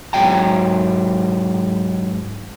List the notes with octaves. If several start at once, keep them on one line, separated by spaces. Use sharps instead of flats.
G#2 F#3 G5 A#5